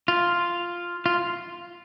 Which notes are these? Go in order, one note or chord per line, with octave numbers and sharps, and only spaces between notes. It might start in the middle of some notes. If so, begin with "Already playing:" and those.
F4
F4